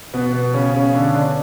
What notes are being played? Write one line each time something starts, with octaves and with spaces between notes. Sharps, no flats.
B2 B3
B2 B3
C#3 C#4
C#3 C#4
D3 D4
D3 D4